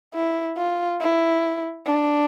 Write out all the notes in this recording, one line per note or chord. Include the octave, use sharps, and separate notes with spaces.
E4
F4
E4
D4